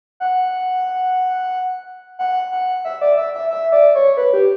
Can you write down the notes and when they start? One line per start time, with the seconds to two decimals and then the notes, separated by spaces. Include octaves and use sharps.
0.20 F#5
2.19 F#5
2.52 F#5
2.85 E5
3.01 D5
3.18 E5
3.34 E5
3.50 E5
3.72 D5
3.95 C#5
4.17 B4
4.33 G4